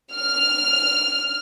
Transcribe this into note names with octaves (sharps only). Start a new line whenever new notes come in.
F6